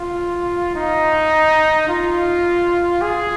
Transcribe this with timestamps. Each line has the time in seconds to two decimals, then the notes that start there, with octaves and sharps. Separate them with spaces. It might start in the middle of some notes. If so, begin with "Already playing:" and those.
Already playing: F4
0.76 D#4
1.88 F4
3.01 G#4